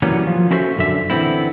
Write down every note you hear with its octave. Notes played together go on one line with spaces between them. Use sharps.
E3 F#3 G3 A#3 B3 C#4
F3
C#4 E4 F#4 A4 C5 E5
B1 F#2 D3 E5
D3 E3 F#3 B3 C4 E4